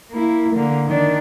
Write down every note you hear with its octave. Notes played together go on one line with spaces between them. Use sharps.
A#3 E4
D3 A#3
D#3 D4